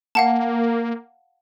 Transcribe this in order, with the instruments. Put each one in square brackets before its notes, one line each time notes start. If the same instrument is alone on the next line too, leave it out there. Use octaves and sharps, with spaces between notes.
[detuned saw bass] A#3 [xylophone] F5 F#5 A5